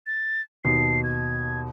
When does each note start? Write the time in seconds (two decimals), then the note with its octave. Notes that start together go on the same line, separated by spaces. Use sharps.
0.07 A6
0.65 D#2 B2 C7
1.04 G#6